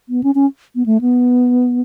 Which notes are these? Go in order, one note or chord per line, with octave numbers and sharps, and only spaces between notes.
B3
C#4
C#4
B3
A3
B3